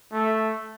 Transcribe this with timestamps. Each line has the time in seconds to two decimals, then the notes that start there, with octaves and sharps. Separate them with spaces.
0.12 A3